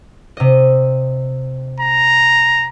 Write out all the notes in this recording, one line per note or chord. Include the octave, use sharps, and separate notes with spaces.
C3 D#5
A#5